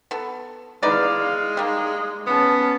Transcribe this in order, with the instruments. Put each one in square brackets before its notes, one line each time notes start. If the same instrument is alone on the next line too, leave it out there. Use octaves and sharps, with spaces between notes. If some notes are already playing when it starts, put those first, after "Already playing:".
[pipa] B3 A4
[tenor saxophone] G#3 [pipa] D#4 B4 D5 [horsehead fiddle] E4 F5
[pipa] G3 A#3 [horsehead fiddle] D#4
[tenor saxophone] B3 [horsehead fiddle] C#4 A5